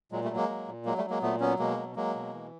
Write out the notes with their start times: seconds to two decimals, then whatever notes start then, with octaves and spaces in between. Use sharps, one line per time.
0.12 A#2 F#3 G#3
0.24 G3 A3
0.30 F#3
0.36 G#3 A#3
0.49 F#3
0.68 A#2
0.85 F#3 G#3 A#3
0.98 G3 A3
1.04 F#3
1.10 G#3 A#3
1.22 A#2 A3 B3
1.40 F#3 B3 C#4
1.59 B2 G#3 A#3
1.78 F#3
1.96 F#3 G#3 A#3
2.15 B2
2.33 E3